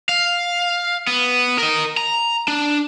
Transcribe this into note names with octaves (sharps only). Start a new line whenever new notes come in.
F5
B3
A#4 D#5
A#5
D4